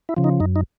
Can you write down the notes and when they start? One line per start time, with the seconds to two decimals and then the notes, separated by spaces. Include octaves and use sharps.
0.09 E4
0.17 C#3 F3
0.24 D#4
0.40 F#2 D#4
0.56 D#4